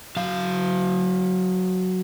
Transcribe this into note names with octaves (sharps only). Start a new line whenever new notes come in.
F#3 F5